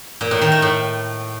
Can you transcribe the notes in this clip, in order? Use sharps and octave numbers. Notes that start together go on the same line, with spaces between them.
A#2
A2
D#3
A3
A2